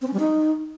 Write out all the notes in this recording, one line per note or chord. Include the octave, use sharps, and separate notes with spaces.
C4
C#4
G3
D#4